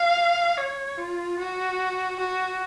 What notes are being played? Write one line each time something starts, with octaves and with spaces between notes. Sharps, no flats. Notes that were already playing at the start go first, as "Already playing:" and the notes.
Already playing: F5
C#5
F4
F#4
F#4